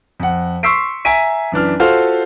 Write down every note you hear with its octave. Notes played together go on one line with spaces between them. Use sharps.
F2 F#5
C6 C#6 E6 B6 C7 D7
E5 G#5 A#5 B6 D7 D#7
F#2 E3 D4 F6
F4 F#4 A4 C5 F5 F6